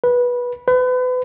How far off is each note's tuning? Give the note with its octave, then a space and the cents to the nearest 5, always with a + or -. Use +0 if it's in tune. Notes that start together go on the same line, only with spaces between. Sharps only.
B4 -15
B4 +35